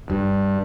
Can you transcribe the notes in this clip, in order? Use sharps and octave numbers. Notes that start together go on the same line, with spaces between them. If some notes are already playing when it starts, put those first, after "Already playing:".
G2